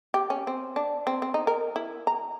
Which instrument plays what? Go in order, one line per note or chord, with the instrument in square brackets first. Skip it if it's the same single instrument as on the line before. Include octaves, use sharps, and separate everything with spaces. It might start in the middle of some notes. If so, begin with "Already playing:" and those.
[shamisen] G4
C#4
C4
D4
C4
C4
D#4
A#4
E4
A#5